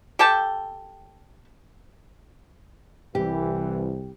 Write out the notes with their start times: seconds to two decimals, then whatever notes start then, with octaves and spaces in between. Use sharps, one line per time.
0.19 G4 A4 G5 A5
3.15 C2 E3 G4